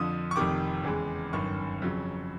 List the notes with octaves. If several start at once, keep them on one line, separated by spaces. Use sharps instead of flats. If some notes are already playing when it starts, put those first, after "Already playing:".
Already playing: F2 D3 F3 D#6
C#6
F1 F2 C3 D#3 D6
E2 C#3 E3 G#3
G1 F#2 D#3 C#6
F2 C#3 F#3